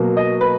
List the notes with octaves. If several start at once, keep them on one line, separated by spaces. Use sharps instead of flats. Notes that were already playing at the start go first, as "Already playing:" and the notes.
Already playing: B2 F#3 A#3
D#5
B4